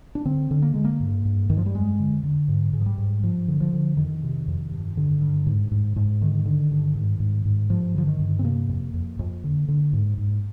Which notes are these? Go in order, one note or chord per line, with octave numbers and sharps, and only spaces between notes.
D4
D3 C4
D3
A#3
D3 G#3
A#3
G2
G2
G2 D#3
F3
G3
F2 G#3
D3
D3
G#2
G#2
F3
G3
G#2
G2 F3
D3
F3
D3
F2 D#3
C3
F2
G2
D3
G2
G#2
G#2
G#2
D3 D#3
D3
G2
G#2
G#2
G#2
G2 F3
D3 F3
D#3
G2
C4
C3 A#3
F2
F2
F2
D3
D3
G#2
G#2